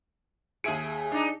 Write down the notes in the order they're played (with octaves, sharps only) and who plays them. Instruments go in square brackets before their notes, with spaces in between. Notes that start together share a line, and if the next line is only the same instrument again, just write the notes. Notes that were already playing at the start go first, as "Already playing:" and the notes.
[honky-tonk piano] D#2 E5 D7 [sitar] G#4
[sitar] D4 D#4